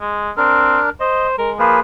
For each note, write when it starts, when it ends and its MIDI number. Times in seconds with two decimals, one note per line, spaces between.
0.01 0.30 56
0.37 0.79 60
0.37 0.89 62
0.37 0.89 70
1.00 1.35 72
1.00 1.27 75
1.38 1.58 56
1.38 1.51 70
1.59 1.80 53
1.59 1.80 58
1.59 1.80 68
1.59 1.80 71